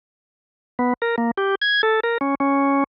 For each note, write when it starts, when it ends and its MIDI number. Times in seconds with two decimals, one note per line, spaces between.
0.79 0.93 59
1.02 1.16 70
1.18 1.31 58
1.38 1.55 67
1.62 1.82 92
1.83 2.00 69
2.03 2.18 70
2.21 2.35 61
2.40 2.84 61